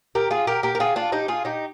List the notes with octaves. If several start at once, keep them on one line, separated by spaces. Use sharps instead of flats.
G4 A#4
F4 G#4
G4 A#4
G4 A#4
A#4
F4 G#4
D4 F4
D#4 G4
F4 G#4
D#4 G4